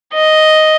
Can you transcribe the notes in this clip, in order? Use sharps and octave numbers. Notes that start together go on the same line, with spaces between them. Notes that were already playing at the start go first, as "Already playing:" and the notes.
D#5